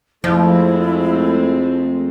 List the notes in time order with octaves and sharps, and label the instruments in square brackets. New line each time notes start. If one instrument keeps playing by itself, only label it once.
[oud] F2 [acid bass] F3 [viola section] G#3 A3 C4 [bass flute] E4